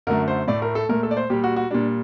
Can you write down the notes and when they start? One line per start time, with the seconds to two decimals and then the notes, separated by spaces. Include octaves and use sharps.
0.07 F#2 D3 A3 A#4
0.28 C5
0.47 A2 A3 D5
0.62 A#4
0.75 A4
0.89 A#2 A3 A#4
1.03 A4
1.11 D5
1.17 C5
1.30 A#2 G3 G4
1.44 F#4
1.56 F#4
1.71 A#2 G3 D4